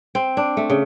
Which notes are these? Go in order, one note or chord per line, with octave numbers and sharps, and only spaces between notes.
C4
D4
A3
C#3